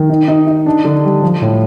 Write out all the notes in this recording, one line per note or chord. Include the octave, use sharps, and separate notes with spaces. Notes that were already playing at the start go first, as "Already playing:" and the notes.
Already playing: D#3
D#4
D#4
D#4
D4
D3
G3
F3
A2